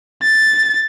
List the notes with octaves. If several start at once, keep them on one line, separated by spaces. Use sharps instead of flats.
A6